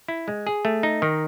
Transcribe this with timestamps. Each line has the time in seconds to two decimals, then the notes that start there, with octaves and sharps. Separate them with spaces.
0.08 E4
0.28 G#3
0.47 G#4
0.65 A3
0.83 D#4
1.02 D#3